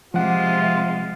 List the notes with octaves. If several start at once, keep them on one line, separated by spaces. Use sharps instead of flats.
C3 F3 G#3 F4 F#5